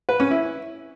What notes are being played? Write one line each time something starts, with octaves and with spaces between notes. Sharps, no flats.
B4
C#4
E4